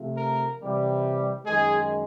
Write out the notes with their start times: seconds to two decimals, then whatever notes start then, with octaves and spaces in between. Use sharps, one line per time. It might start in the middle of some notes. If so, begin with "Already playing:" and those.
Already playing: C3 F3 A3
0.17 A#4
0.60 C3 E3 G3
1.45 F#2 D#3 G#3 G#4